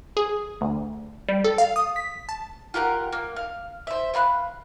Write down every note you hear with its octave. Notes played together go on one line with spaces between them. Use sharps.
G#4
D2
G3
A4
F5
D#6
B6
A5
F4 G4 A#4 F#5
A#3
F5
C5 E5
E5 F5 B5 F#6